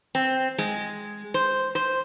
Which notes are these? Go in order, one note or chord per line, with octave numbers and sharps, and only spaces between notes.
C4
G#3
C5
C5